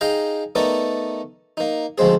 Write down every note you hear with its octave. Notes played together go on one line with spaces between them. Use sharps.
D#4 G#4 F5 G5 A#5
A3 B3 D#4 A#4 D5
A#3 D#4
D2 F3 G#3 C4 G#4